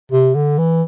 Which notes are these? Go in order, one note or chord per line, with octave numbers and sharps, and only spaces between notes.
C3
D3
E3